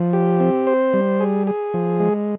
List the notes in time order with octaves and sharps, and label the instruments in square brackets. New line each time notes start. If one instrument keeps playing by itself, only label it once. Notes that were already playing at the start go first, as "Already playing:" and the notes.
Already playing: [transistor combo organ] F3
G4
C4
C5
G3
G#4
G#4
F3
G#3